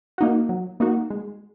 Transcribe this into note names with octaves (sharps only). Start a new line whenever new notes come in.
A#3 D#4 F#4
F#3
A#3 D#4 F#4
G#3